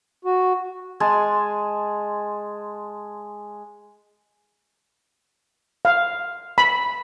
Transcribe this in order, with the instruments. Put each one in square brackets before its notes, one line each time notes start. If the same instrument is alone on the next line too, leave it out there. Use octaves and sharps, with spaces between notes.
[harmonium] F#4
[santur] G#3 G#5 A5 C6
[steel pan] F5
B5